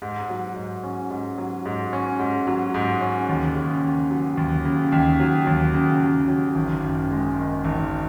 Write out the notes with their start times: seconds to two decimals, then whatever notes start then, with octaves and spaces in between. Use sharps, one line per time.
0.02 G#2
0.29 F#3
0.56 G#2
0.83 C#4
1.10 G#2
1.38 F#3
1.66 G#2
1.93 C#4
2.19 G#2
2.47 F#3
2.74 G#2
3.01 C#4
3.29 D#2
3.56 C#3
3.83 D#2
4.10 F#3
4.37 D#2
4.65 C#3
4.92 D#2
5.20 F#3
5.47 D#2
5.74 C#3
6.01 D#2
6.28 F#3
6.55 G#1
6.83 F#2
7.11 G#3
7.38 D#3
7.64 G#1